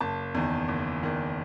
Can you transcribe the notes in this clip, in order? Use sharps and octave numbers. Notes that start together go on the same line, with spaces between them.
F#1 A5
E2 D#3
F#1
E2 D#3